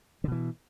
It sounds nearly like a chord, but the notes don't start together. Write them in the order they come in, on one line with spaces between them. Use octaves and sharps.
D3 B2 E3